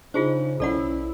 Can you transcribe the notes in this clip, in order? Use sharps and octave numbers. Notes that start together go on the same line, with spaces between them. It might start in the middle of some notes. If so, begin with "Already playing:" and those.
C#3 D4 D#4 F4 G#4 C5
B1 C#4 E4 A4 D5 F#5